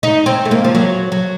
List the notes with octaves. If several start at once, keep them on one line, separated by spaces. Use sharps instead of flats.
D#4
C4
A3
A#3
F3
F#3
F#3